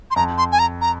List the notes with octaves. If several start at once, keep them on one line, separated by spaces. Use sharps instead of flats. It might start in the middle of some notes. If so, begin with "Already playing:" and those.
C6
F2 A#5
C6
G#5
A#5
A#5